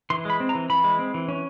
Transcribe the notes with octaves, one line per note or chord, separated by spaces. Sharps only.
E3 C6
G#3 B5
C4
A#5
E3
E3 B5
G#3
C4
E3
C#4